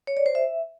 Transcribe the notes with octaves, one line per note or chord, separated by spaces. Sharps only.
C#5
D5
C5
E5